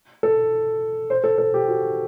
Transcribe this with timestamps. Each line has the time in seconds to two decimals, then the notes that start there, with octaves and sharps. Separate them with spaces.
0.23 A4
1.10 C5
1.24 A4
1.38 A4
1.54 G4
1.68 F#4